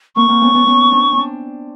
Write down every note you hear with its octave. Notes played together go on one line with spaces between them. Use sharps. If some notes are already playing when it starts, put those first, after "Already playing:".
A#3 C4 C#6
A#3 C4
B3 C#4
B3 C#4
B3 C#4
C4 D4
C#4
C4 D4